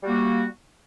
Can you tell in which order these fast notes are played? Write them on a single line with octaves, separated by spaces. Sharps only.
G3 F#4 A#3